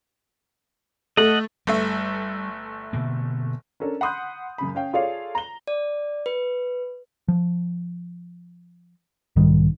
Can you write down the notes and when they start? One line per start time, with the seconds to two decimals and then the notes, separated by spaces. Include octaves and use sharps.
1.17 A3 D#5 F#5
1.67 G1 G3 A3 E5
2.93 B2 D3 A#3
3.80 C#4 D4 A4 A#4
4.01 F#5 B5 C6 D#6 F#6 G6
4.58 F#2 C#3 B5
4.75 C#4 F5 G5
4.93 F4 G#4 A4 C#5 D5 F5
5.35 A#5 G7
5.68 D5
6.26 B4
7.28 F3
9.36 B1 G#2 D#3 G3